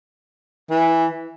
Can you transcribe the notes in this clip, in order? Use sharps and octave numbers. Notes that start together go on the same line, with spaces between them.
E3